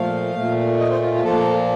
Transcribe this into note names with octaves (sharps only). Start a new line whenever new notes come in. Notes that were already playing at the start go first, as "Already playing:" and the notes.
Already playing: A#2 F3 A3 F5
A#2 A3
D#5
C5
F4
F4
A#2 F3 A#3 A4